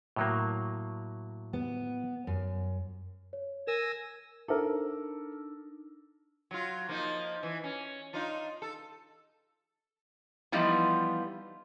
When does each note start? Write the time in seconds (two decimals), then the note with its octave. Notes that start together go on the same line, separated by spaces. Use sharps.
0.16 A2 F#3 A#3
1.53 B3
2.27 F#2
3.33 C#5
3.67 A#4 G#5 E6 A#6
4.48 D4 D#4 A4 A#4 E6
6.51 F#3 F4
6.89 F3 A#3 D#4
7.43 E3
7.64 C#4
8.13 D4 D#4 F4
8.62 A4
10.52 E3 F3 G3 B3 D#4 F4